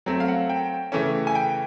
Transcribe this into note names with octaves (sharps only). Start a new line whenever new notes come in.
F#3 A3 C4
F5
F#5
G5
C#3 E3 A3 C#4
G#5
G5